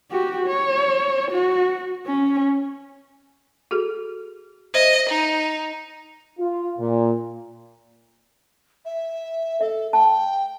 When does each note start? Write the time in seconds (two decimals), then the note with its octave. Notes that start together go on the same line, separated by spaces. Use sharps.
0.11 F#4 G4
0.47 C#5
1.31 F#4
2.07 C#4
3.71 F#4 G#4 A4
4.74 C5 D#5 E5
5.09 D#4
6.39 F4
6.79 A#2
8.85 E5
9.61 A4 E5
9.93 G5 A5